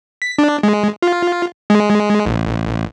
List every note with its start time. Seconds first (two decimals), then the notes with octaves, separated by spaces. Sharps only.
0.22 B6
0.38 D4
0.63 G#3
1.02 F4
1.70 G#3
2.26 A1